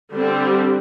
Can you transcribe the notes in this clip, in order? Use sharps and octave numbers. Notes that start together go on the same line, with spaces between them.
D3 G3 C4